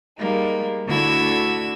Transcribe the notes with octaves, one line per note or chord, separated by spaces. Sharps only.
G3 G#3 A#3 D#4
D2 D3 E4 F#4 E6 G#6